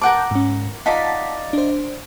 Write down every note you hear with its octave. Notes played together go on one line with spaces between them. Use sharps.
A#4 F#5 A5 D6 F#6 G6
G#2 C#4
D#4 F4 D5 F#5 A5 B6
D4 C5